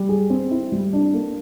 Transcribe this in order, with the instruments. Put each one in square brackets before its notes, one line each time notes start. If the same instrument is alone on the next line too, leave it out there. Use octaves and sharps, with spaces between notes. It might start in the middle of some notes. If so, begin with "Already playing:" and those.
Already playing: [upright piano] G3
G#4
C4
E4
G3
D4
A#3